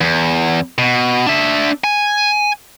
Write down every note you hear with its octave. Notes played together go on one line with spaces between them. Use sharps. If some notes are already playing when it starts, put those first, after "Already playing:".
E2
B2
D4 E5
G#5